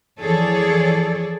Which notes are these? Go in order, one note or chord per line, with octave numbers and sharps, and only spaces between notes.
E3 F3 G#4 A4 C#5 D5